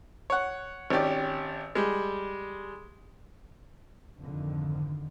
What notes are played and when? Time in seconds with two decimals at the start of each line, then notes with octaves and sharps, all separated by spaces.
0.30 C#5 F#5
0.90 G#1 C#4 G4 D5
1.75 G3 G#3
4.20 F2 G#2 D3 D#3 F3